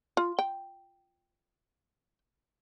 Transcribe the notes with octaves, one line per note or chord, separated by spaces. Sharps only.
F4
G5